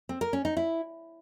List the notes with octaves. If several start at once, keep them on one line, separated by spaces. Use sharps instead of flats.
C4
A#4
C#4
D#4
E4